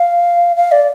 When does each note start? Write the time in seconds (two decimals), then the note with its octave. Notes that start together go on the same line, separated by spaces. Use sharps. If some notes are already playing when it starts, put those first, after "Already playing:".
Already playing: F5
0.56 F5
0.72 D5